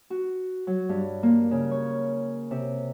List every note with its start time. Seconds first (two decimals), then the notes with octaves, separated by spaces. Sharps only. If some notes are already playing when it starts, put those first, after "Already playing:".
0.10 F#4
0.67 F#3
0.89 G2
1.23 A#3
1.51 C#3
1.71 C#5
2.51 C3